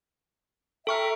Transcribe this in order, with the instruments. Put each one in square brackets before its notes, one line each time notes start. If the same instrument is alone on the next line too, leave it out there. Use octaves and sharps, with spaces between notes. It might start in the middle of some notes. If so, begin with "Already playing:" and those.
[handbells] A4 C#6 F6 [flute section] E5 G5 A#5